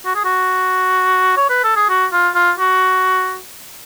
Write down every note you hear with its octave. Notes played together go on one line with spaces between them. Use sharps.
F#4
G#4
F#4
C#5
B4
A4
G#4
F#4
F4
F4
F#4